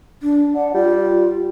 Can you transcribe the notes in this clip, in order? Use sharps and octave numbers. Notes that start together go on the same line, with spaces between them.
D4
D4 F#5
G3 F4